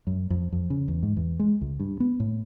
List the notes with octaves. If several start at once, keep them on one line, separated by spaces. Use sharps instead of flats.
F#2
F2
F2
C#3
E2
G#2
E2
G#3
C#2
G2
B3
A2